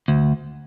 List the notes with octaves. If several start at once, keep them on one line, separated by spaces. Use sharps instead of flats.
D2